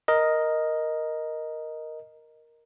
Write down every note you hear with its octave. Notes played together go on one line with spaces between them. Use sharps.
A#4 D#5